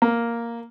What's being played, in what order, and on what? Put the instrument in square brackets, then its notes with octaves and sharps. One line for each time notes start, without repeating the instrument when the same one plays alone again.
[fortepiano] A#3